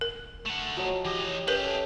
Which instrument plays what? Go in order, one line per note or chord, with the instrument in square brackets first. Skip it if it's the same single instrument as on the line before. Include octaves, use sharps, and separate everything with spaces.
[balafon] A#4
[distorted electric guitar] A3 F#5
[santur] F3 F#3 D#5
[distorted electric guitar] E3 D#5 [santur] G4
[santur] C#4 [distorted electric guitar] G4 G#4 [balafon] A#4 B4
[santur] A3 A4 D#5